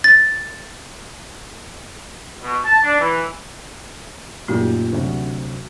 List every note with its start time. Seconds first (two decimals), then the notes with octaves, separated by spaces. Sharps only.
0.04 A6
2.43 B2
2.64 A5
2.83 D4
2.99 E3
4.48 F#2 A#2 A3 D#4 G4
4.93 D2 C3 F#3